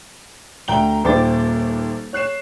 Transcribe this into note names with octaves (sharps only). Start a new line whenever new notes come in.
D2 G5 A#5 G7
D#1 D#2 C5 G5 D6 A6
C#5 F#6 C7 E7